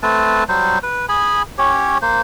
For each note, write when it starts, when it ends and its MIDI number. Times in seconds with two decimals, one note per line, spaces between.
0.03 0.44 57
0.03 0.44 60
0.03 0.44 71
0.03 0.44 81
0.48 0.78 54
0.48 0.78 55
0.48 0.78 72
0.83 1.06 71
1.09 1.42 68
1.09 1.42 80
1.09 1.42 83
1.58 1.98 61
1.58 1.98 67
1.58 1.98 73
2.02 2.22 58
2.02 2.22 72